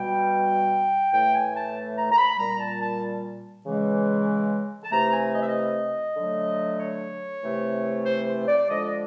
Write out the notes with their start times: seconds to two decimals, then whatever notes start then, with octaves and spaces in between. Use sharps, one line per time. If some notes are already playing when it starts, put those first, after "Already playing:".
Already playing: B2 G3 G5
1.12 A2 E3 A3 G5
1.33 G#5
1.55 A5
1.97 A#5
2.11 A#5
2.17 B5
2.38 A#2 G3 A#5
2.59 A5
2.81 A5
3.65 C#3 E3 G#3
4.83 A5
4.90 C3 E3 A3 A#5
5.11 G#5
5.32 D#5
5.40 E5
5.47 D#5
6.16 D3 F#3 A3
6.80 C#5
7.43 C3 E3 A3
8.06 C5
8.27 C5
8.47 D5
8.69 D3 F3 G#3 D#5
8.84 D5